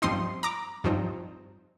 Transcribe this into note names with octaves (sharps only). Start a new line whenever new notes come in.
G2 F3 C4 D#4 C6 D#6
A#5 D6
G2 F3 C4 D#4